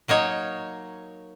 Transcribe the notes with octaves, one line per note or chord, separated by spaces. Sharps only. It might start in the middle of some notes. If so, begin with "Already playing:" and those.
F#3 A#3 D#4 C#5